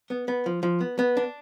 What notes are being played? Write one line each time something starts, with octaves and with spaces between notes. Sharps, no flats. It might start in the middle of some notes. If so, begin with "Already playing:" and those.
B3
B3
F3
F3
B3
B3
D4